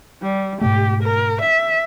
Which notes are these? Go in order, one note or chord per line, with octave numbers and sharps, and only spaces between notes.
G3
G#2 B2 A3 G4
A#4
E5